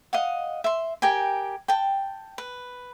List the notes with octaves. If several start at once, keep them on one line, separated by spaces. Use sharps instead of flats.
D#5 F5 F#5
E5 C6
G4 A#4 G5 G#5
G5 A5
B4